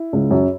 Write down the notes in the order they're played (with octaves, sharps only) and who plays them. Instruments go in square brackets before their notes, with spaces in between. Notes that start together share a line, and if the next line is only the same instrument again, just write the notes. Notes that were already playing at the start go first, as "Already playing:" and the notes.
Already playing: [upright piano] E4
C#2
F#2